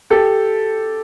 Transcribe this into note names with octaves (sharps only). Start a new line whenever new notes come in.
G4 A4